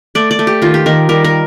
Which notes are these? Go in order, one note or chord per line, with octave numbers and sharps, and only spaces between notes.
A3 D5
D5
A3
G4
D#3 F4
G4
D#3 A#4
G3 A#4
A#4